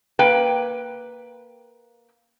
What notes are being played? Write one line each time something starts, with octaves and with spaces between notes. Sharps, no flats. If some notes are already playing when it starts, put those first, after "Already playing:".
A#3 B4 G5